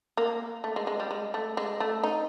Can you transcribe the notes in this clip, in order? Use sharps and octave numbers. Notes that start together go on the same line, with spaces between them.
A#3
A3
G#3
G#3
G3
G#3
A3
G#3
A3
D#4